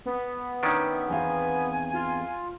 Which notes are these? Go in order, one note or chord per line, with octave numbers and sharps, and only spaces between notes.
B3
D#3 C#4 D4 E5
E2 C4 F5 G#5
F4